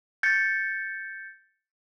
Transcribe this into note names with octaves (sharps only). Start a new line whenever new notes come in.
G6 A6 C#7